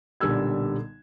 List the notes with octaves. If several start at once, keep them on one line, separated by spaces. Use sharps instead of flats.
B1 A#2 D3 G3 E6 G#6